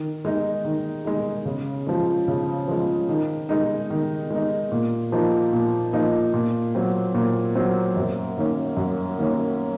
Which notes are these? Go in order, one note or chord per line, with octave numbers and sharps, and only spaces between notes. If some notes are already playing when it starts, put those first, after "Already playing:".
Already playing: D#3
G#3 D#4
D#3
G#3 D#4
C#3
F3 G#3
C#3
F3 G#3
D#3
G#3 D#4
D#3
G#3 D#4
A#2
F3 A#3 D#4
A#2
F3 A#3 D#4
A#2
F#3 C4
A#2
F#3 C4
F#2
D#3 A#3 C#4
F#2
D#3 A#3 C#4